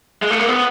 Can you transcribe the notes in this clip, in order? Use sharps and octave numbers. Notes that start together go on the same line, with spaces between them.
G#3
A3
A#3
B3